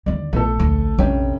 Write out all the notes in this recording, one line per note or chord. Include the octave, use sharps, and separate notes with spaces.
D#2 D3 D5
A#1 B2 A3 A4
D2
F1 C#4 D4 G5